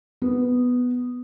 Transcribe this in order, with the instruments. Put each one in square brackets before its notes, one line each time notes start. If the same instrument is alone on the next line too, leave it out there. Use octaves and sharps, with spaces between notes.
[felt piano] B3